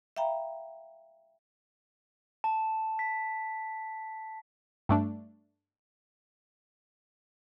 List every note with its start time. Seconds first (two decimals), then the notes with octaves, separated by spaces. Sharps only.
0.16 E5 F5 G5 A#5 B5
2.44 A5
2.99 B6
4.89 G2 A3 D4